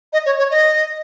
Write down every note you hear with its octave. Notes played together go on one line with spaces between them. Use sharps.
D#5
C#5
C#5
D#5